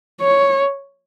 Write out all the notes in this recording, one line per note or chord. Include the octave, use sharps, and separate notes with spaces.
C#5